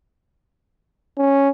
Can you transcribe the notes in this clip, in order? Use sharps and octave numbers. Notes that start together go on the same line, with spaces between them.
C#4